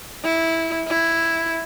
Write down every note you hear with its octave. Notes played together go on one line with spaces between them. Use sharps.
E4
E4